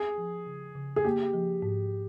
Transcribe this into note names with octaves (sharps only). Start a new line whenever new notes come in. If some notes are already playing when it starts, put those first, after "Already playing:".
Already playing: C4 G#4
F3
C#3
C#3
G#4
A#3 G4
F3
G#2